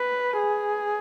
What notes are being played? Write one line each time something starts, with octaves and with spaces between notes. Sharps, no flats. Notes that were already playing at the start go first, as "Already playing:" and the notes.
Already playing: B4
G#4